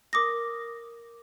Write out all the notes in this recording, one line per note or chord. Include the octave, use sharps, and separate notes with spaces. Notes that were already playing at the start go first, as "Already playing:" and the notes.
A#4 D6 D#6 A#6